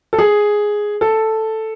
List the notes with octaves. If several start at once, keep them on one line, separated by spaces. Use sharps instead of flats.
A4
G#4
A4